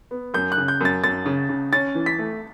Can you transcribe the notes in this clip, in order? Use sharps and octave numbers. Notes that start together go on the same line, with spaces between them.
B3
F#2 G6
F#6
C#3
G6
F#2 A6
F#2 A6
C#3
C#3
C#4 A6
E3
B6
A3